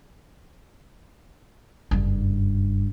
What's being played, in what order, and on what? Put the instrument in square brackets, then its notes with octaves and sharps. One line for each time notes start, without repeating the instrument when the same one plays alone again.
[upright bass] F#1 G2